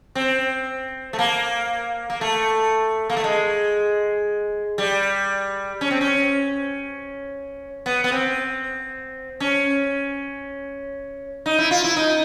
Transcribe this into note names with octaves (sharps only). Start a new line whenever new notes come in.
C4
A3
A#3
A#3
A3
A#3
A3
G#3
G3
C#4
C4
C#4
B3
B3
C4
C#4
D#4
E4
F4
E4
D#4